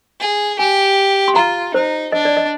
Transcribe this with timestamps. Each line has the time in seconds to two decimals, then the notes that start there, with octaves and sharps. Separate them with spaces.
0.20 G#4
0.59 G4 G#5
1.28 C6
1.36 F4 A#5
1.74 D#4 C5
2.12 D4 D#5
2.25 D5
2.37 D#5